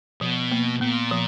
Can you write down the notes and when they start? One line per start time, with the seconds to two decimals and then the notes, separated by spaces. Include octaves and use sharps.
0.21 B2 F3
0.51 A#3
0.81 A#2 B3
1.11 F3